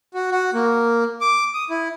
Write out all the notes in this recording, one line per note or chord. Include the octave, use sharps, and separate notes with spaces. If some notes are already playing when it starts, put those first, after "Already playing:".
F#4
F#4
A#3
D6
D#6
E4